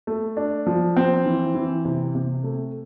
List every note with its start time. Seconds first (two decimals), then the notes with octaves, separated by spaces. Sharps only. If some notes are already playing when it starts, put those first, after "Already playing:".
0.07 A3
0.37 D4
0.67 F3
0.96 C4
1.26 E3
1.55 E3
1.85 C3
2.15 C3
2.44 A3